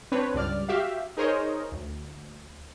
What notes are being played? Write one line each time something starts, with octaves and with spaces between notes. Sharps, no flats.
C4 D4 B4 C#5
C#2 G2 D5 F6
F#4 G4 E5 F5
D#4 G#4 A#4 C5 C#5 D#5
D2